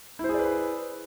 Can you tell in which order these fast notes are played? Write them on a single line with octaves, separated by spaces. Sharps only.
E4 C5 G#4 D5 B4